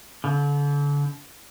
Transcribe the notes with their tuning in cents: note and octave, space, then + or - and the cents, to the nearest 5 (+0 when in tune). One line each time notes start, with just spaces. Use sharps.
D3 -35